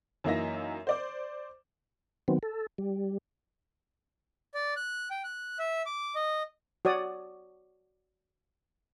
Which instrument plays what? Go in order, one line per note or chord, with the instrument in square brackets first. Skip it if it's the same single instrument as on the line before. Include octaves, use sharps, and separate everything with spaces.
[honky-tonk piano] F#2 E3 A#3 D#4 E5 A#6
C5 D5 D6
[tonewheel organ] D#3 F#3 B3 C4
A4
G3
[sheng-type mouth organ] D5
F#6
G5
F#6
E5
D6
D#5
[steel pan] F#4 C#5 D5 D#6